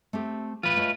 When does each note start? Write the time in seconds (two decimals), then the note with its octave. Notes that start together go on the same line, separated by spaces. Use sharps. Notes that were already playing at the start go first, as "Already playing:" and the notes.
0.13 A3 C4 G4
0.63 A2 E3 F4 B4
0.76 A3 C#5 D#5